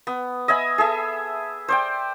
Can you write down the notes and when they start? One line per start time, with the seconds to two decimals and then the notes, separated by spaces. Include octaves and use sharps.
0.07 B3
0.48 D#5 E5 G#5 B5
0.78 G#4 A4 E5
1.68 C5 D5 G5